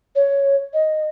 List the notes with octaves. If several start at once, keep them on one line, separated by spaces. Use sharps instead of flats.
C#5
D#5